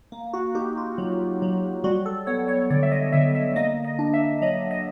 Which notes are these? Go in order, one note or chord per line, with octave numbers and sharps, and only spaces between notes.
A#3
F#4
D#4 G4
F4
F#3
F#3
G3 F#4
A4
B3 C#5
C#5
D3 D5
E5
D#5
D3 E5
E5
A#3 D#5
D#5
D4
E5
F#3 D#5
D#5